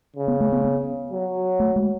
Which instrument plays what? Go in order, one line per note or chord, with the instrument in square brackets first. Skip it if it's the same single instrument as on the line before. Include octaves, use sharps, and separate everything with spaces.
[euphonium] C#3
[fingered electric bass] B3
A3
B3
B3
[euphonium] F#3
[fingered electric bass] A3
G#3